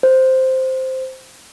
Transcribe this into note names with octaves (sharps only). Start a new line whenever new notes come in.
C5